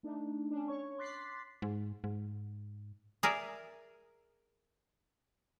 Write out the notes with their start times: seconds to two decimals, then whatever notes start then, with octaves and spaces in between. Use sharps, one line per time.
0.03 A3 D4 D#4
0.51 C#4 D4
0.68 C#5 C#6
0.98 C6 D6 F#6 A6 B6 C7
1.62 G#2
2.04 G#2
3.23 G#4 A#4 D5 E5